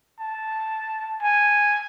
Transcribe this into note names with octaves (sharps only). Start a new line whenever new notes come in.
A5
G#5